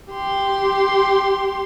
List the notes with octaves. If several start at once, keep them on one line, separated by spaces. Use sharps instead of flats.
G4 C6